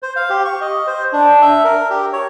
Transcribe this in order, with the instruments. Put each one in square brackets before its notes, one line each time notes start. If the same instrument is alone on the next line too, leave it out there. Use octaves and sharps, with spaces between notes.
[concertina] C5
F5
G4
C#6
D#5
C5
D4
E5
A#4
G4
C#5